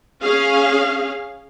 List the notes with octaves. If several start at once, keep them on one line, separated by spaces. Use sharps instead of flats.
C#4 G#4 F5